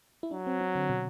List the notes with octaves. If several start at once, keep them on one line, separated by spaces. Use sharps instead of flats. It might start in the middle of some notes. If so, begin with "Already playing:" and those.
E4
F#3 D4
C4
C4
D3
B2